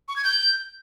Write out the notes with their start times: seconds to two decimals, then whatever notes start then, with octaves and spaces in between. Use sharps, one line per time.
0.08 C#6
0.16 G#6
0.24 G6